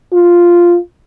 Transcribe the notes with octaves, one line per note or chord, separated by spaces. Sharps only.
F4